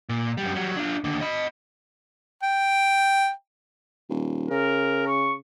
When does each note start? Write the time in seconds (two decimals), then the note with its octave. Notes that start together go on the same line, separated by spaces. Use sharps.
0.09 A#2
0.37 F#2 G3
0.54 F#3 G3
0.77 D4 F4
1.04 D#2 D3
1.21 D#5 B5
2.43 G5
4.10 D#1
4.50 C#3 A#4
5.07 C#6